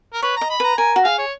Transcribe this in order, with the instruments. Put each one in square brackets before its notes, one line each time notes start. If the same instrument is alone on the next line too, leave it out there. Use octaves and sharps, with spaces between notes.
[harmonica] A#4
[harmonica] B4 [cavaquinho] C#5
[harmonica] A#5
[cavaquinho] D#5
[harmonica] B5
[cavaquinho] B4 [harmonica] A#5
[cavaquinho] A#4 [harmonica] G#5
[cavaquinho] F#4
[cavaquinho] G#4 [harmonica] F5
[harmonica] C#5